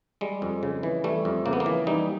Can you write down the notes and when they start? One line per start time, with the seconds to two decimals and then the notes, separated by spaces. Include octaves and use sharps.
0.21 G3 G#3
0.42 F2
0.63 C#3
0.83 E3
1.04 G3 A3
1.25 F2
1.45 C#3 A#3
1.53 B3
1.60 A#3
1.66 E3
1.87 G3 D#4